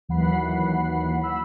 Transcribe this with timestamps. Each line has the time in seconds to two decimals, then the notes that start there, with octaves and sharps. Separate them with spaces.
0.08 D#2 E3 F#3 F#5 B5 C7
1.21 B5 E6